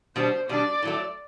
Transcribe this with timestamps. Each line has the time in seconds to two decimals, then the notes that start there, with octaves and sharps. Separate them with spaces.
0.16 B2 G3 D4 C5
0.49 B2 G3 D4 D5
0.82 A2 F#3 A3